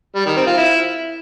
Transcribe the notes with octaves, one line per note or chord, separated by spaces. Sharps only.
G3
D#3
C4
F4
E4